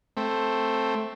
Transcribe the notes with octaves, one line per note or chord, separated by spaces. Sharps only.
A3 C4